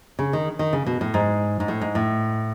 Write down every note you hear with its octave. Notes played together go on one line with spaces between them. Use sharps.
C#3
D#3
D#3
C#3
B2
A2
G#2
G#2
A2
G#2
A2